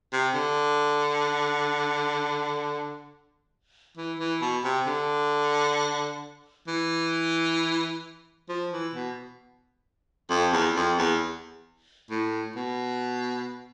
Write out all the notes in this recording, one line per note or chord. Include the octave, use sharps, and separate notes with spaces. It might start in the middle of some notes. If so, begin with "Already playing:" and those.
C3
D3
E3
E3
B2
C3
D3
E3
F3
E3
B2
F2
E2
F2
E2
A2
B2